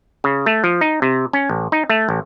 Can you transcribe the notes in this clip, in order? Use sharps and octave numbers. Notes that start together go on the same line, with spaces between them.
C#3
A3
F3
D#4
C3
C#4
A1
D#4
A3
A1